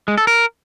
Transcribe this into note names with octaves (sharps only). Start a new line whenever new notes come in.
G#3
A4
A#4